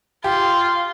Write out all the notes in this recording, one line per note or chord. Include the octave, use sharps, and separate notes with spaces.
F4 G4